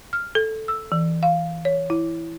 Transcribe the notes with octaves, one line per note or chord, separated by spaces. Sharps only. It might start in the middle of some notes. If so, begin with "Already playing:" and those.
F6
A4
E6
E3
F5
C#5
E4